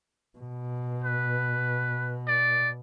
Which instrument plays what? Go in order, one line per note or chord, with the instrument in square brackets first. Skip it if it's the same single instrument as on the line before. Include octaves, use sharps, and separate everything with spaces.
[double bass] B2
[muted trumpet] B4
D5